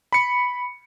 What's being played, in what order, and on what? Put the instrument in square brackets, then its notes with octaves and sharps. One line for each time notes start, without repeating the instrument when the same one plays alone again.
[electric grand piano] B5 C#7